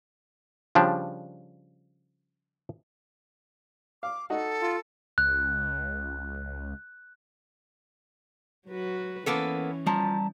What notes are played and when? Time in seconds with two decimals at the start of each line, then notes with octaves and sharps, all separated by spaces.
0.75 C#3 F3 G3 D4
4.03 F5 D6
4.30 D#4 F#4 A4
4.62 F4
5.18 C#2 F#6
8.67 F#3 F#4 B4
9.26 E3 A#3 B3 C#4 A4
9.86 F3 G3 A5 A#5